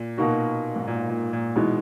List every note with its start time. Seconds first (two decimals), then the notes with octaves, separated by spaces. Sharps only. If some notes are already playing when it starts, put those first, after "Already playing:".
Already playing: A#2
0.18 B2 A#3 D#4 F#4
0.76 G#2
0.87 A#2
1.10 A#2
1.33 A#2
1.56 B2 E3 G#3 D#4